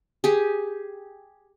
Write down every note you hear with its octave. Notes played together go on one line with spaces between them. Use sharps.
G4 G#4